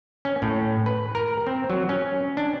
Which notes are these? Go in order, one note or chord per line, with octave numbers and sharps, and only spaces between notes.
C#4
A2
B4
A#4
C4
F#3
C#4
D4